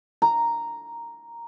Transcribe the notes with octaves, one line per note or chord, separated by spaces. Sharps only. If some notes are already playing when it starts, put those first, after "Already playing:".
A#5